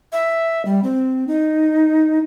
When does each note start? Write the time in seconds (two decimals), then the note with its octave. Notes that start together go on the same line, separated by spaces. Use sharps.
0.13 E5
0.65 G3
0.84 C4
1.28 D#4